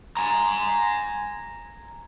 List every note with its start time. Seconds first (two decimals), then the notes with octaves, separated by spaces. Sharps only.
0.17 G#5 A#5